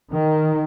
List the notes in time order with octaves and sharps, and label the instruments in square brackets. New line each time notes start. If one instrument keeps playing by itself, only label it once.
[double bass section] D#3